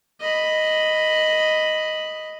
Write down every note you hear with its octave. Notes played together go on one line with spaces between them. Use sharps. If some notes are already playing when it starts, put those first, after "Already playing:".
D#5 B5